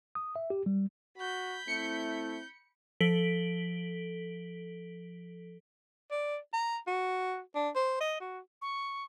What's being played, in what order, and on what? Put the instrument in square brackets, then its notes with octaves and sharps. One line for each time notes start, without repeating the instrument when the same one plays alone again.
[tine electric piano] D#6
E5
G4
G3
[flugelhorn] F#4 [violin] B5 G6
[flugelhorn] A3 [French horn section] C4 E4 [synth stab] C#7
[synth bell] F3 A4 B6 D7 F#7 G7
[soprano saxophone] D5
A#5
F#4
D4
C5
D#5
F#4
[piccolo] C#6